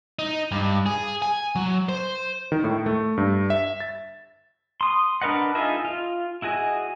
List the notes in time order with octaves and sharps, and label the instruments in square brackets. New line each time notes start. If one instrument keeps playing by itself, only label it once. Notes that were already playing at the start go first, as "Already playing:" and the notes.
[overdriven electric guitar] D#4
G2
G#4
G#5
F#3
C5
[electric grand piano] D#3
A2
A3
G2
E5
A6
[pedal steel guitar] C6 D#6
D4 A#4 B4 D#5 F#5
D#4 F4 G#4 D#5 E5
F4
E4 F#4 G#4 D#5